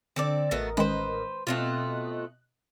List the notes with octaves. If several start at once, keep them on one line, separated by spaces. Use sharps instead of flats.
D3 C4 A4 D5
A1 A3 B3 F#4 A#4 D#5
D#3 G#3 C#4 B4 C5
B2 A3 C4 F4 D#5 F#6